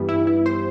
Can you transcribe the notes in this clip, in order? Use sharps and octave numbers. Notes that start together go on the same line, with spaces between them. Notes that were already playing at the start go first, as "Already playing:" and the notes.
Already playing: G2 E3 G3 B3
E4
E4
C5